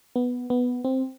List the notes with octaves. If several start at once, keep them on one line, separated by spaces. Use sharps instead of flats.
B3
B3
C4